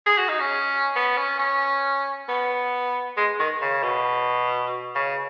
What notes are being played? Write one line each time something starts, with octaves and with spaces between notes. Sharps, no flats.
G#4
F#4
D#4
C#4
B3
C#4
C#4
B3
G#3
D#3
C#3
B2
C#3